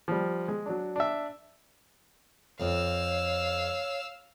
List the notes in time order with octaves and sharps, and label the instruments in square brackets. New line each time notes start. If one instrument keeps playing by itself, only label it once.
[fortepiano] F3 G3
G#3
F#3 D4
D4 E5
[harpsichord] F2 [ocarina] C#5 [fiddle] F5 E6